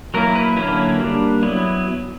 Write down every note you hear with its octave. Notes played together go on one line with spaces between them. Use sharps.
F#3 A#3 E4 A#4
B4
D3 F#3 A#3 C#4 E4 B4
G3 A#3 D4
F#3 B3 E4